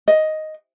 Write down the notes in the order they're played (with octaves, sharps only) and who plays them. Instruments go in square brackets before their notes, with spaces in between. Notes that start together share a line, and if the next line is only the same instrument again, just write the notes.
[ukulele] D#5